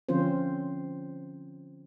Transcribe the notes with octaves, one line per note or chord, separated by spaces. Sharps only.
D3 F3 C4 C#4 F4 C5